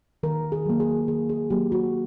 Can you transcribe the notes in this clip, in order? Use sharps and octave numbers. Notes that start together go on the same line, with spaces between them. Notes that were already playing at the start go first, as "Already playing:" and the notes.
D#3 A#4
G#4
F#3 A#3
G#4
D#3 G#4
G#4
F#3 A#3 G4
F#4